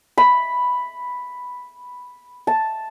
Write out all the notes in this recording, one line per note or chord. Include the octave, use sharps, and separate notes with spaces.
B5
A5